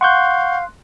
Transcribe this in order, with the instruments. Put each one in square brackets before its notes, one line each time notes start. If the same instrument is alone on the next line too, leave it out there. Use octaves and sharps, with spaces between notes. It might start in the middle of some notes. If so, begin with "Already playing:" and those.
[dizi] F5 [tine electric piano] F#5 C#6 G6 [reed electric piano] C6 F#6